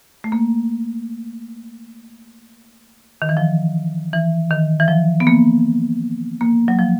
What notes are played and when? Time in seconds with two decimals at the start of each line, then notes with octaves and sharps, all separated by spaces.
0.24 A3
0.32 A#3
3.22 D#3
3.29 E3
3.37 F3
4.13 E3
4.50 D#3
4.80 E3
4.88 F3
5.20 B3
5.27 A#3
6.41 A#3
6.68 F#3
6.79 F3